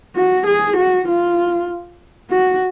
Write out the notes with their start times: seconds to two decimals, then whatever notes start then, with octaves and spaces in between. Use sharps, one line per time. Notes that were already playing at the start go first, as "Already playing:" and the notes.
0.16 F#4
0.47 G#4
0.77 F#4
1.08 F4
2.31 F#4